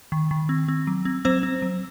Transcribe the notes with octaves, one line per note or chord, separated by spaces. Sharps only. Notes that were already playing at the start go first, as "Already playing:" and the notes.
D#3
D#3
C4
C4
F#3
C4
F#3 C4 C5
C4
F#3